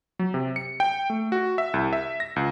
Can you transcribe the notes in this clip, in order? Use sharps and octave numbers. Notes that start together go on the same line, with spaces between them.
F#3
C3
C#7
G5
A3
F#4
E5
C2
E5
A#6
C#2